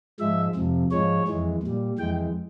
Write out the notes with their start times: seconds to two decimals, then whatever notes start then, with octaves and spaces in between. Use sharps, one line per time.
0.19 G#2 F3 G#3 E5
0.55 F2 C3 F3
0.91 G#2 F3 G#3 C#5
1.27 F2 E3 G#3
1.63 A#2 G3
1.99 F2 E3 G#3 G5